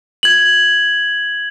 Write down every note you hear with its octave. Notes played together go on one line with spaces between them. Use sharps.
G#6 F#7